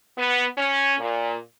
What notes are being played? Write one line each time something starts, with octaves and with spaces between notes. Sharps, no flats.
B3
C#4
A#2